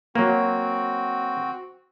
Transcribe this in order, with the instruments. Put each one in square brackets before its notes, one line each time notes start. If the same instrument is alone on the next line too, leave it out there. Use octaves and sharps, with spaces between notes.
[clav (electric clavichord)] F#3 A#3 [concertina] C4 F#4